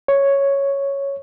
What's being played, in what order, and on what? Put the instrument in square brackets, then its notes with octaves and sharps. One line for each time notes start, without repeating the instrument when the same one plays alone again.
[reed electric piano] C#5